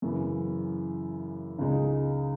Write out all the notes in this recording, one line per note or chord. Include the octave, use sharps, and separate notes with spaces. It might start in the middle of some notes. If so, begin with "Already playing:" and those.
F#2 C#3 E3
C#2 C#3 G#3 D#4